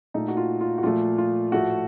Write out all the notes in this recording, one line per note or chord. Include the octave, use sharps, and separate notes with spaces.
A#2 A3 D#4
F#4
F4
F4
F#4
A#2 F3 A3 F4
F4
A2 F3 A3 F#4